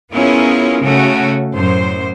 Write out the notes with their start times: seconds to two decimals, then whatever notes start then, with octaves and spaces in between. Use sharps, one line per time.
0.12 B3 C#4 E4 F4 G#4 A#4
0.82 C#3 A3 C#4 F#4
1.54 F#2 A2 C5